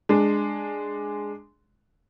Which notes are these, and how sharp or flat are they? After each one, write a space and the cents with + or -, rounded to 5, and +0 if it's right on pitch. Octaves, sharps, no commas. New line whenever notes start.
G#3 +0 D4 +10